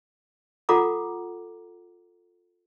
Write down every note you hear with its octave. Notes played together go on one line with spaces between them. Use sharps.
F4 A4 F#5 A#5 D6